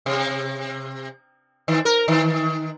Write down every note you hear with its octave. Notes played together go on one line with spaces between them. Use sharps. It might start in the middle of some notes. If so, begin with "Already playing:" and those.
C3
D#3
A#4
D#3